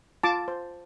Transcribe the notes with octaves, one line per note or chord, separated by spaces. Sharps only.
F4 A5 D6
C5